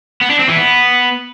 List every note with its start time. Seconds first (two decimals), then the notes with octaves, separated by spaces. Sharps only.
0.21 B3
0.30 D4
0.39 C4
0.48 E3
0.57 B3